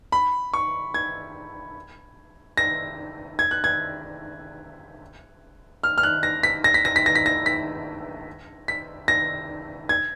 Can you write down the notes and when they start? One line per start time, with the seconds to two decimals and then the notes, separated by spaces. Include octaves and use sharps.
0.12 B5
0.53 C#6
0.94 G#6
2.57 A#6
3.39 G#6
3.51 F#6
3.64 G#6
5.83 F6
5.98 F6
6.03 F#6
6.23 A#6
6.43 B6
6.64 A#6
6.74 B6
6.85 A#6
6.96 B6
7.06 A#6
7.15 B6
7.26 A#6
7.46 B6
8.68 B6
9.08 A#6
9.89 G#6